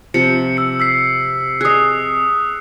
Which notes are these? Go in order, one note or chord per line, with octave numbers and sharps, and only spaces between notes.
C3 F3 C#7
E6 C#7
E6 B6 C7
G#4 D#5 D#6 F#6